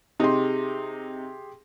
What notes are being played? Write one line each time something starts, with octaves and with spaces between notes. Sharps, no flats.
C3 D#4 G4 G#4 C6